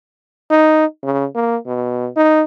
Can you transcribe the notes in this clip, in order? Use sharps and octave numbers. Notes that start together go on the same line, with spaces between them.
D#4
C#3
A#3
B2
D#4